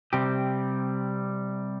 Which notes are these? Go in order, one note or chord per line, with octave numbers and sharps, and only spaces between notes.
C3 G3 C4 G4